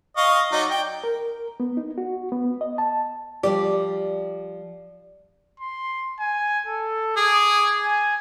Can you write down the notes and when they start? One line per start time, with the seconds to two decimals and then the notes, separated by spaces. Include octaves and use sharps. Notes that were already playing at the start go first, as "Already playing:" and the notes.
0.17 D#5 F5 C#6
0.52 F#3 D#4 D5
0.70 G5
1.04 A#4
1.60 B3
1.77 D#4
1.98 F#4
2.32 B3
2.61 D#5
2.78 A5
3.43 F3 G3 G4 D5
5.60 C6
6.19 G#5
6.66 A4
7.17 G#4 D6
7.83 G#5